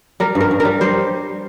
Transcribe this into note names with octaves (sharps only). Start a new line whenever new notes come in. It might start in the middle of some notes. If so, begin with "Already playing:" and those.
G3 A#4
G2
A#4
G2
A#4
G3
G3 C5